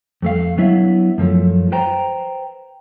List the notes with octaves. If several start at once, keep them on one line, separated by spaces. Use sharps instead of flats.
F2 A3 F5
F#3 B3 D4 E4 E5
F#2 F3 A3
B4 C5 G5 A5 A#5